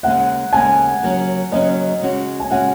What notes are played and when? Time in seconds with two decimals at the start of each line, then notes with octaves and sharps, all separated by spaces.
0.03 D#2 C#3 G#3 F#5
0.53 D#2 C#3 G#3 G#5
1.03 D#2 C#3 F#3 C#4
1.51 D#2 C#3 F#3 C#4 D#5
2.01 C#3 G#3 C#4 F#4
2.40 G#5
2.51 C#3 G#3 C#4 F#4 F#5